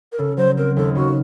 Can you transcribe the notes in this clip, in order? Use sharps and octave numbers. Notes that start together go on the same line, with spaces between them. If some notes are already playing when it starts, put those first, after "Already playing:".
A#4
C#3 A4
F#3 C5
C4 A#4
D#2 A4
C#3 F#4